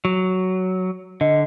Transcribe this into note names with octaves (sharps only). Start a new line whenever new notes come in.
F#3
D3 D#5